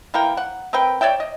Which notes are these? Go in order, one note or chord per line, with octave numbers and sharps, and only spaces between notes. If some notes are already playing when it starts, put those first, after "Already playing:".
E3 A#3 A#4 G5
F#5
C4 A#4 B4 G5
C#5 D5 E5 G5
D#5